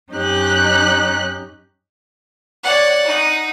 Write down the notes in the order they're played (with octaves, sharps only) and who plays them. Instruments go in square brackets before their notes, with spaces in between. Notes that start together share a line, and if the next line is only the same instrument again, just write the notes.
[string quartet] F#2 C#4 D#4 G4 F#6
[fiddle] C#5 D5 [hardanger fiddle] F#5
[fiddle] D#4 D#6